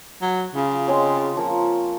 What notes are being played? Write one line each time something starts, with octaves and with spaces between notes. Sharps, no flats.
F#3
C#3 F4
G#3 C4 C#4
A5
F3 A#3 A#5